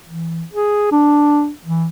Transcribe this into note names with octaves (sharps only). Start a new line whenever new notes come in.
E3
G#4
D4
E3